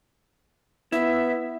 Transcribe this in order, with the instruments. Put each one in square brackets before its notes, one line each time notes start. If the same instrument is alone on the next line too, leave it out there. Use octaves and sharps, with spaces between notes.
[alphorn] B3 [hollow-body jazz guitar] E4 [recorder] E5